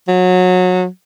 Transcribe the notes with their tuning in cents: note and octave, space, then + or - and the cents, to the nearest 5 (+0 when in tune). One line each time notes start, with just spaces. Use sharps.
F#3 -25